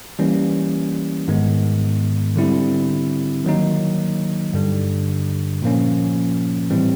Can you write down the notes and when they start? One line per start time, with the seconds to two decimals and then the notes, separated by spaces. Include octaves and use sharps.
0.19 E3 G3 A#3 C#4
1.28 G#2 D#3 G#3 B3
2.36 D3 G3 C4 E4
3.45 D#3 F#3 A#3 D#4
4.54 G2 D3 G3
5.62 A#2 F3 A#3 C#4
6.70 A2 E3 G3 C4